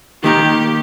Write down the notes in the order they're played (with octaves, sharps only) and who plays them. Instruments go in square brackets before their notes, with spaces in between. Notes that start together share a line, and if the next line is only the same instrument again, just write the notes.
[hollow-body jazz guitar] D#3 A#3 D#4 A#4 [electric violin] G4